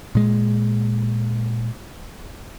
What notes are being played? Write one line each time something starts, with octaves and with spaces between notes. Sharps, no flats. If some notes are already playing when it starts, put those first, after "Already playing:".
A#2 G#3